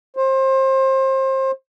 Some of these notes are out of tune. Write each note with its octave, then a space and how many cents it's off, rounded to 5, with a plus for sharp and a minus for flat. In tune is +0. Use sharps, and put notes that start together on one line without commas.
C5 +30